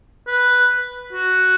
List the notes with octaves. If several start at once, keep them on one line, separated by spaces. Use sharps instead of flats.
B4
F#4